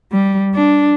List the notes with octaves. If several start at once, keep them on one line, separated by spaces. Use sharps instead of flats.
G3
D4